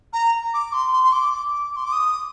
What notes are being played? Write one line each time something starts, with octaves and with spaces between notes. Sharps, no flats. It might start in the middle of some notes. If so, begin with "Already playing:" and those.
A#5
D6
C6
C6
C6
D6
D6
C6
D6
D#6